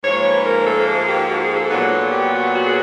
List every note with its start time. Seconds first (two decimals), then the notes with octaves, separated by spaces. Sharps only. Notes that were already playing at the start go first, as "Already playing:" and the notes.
0.04 G#2 F3 A#3 C#5
0.24 B4
0.46 A#4
0.67 A4
0.87 G#4
1.08 G4
1.28 F#4
1.43 G#4
1.56 A4
1.70 A#2 F#3 B3
2.12 G4
2.33 F#4
2.54 F#4
2.67 G#4